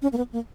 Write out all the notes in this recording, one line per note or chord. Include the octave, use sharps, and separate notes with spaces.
C#4
A#3
B3
A#3